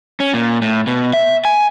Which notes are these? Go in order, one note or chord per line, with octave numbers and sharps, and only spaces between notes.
C#4
A#2
A2
B2
E5
G#5